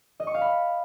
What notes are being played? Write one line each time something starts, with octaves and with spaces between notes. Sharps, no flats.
D#5
C#6
F5
B5